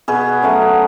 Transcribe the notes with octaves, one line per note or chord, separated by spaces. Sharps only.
B2 G#4 B4
F#3 A3 C#4